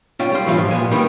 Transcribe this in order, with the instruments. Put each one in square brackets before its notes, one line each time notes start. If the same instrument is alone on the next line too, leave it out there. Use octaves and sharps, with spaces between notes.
[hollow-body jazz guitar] C#4 F4 D5 G5
G3 C6
A2 E3 G3 D4 F4
G#2 F3
A#2 B3 G#5
D3 D#3 G3 A#3 B3